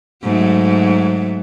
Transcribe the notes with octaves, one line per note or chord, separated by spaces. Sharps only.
G#2 F#3 A3